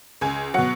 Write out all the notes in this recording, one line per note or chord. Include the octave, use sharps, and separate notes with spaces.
C#2 G#5
B2 F#3 F#5